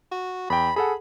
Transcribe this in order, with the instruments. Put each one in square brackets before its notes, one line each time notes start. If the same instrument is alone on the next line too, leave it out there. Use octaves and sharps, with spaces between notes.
[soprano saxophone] F#4
[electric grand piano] E2 G5 [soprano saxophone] B5
[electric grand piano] G#4 A4 F#5 [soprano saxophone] B5